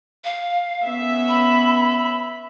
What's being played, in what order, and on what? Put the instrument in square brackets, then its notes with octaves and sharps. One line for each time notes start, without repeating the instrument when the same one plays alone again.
[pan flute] F5
[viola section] B3 C#4 E5
[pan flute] B5